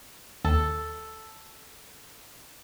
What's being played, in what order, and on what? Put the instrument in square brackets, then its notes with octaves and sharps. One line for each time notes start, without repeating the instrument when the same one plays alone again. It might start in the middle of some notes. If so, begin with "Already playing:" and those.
[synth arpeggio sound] D#2 [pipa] A4